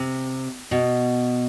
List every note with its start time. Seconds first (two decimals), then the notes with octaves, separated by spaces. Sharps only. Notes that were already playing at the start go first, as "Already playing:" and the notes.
Already playing: C3
0.71 B2